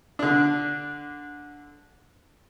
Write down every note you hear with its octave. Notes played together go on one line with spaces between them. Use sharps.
D3 D4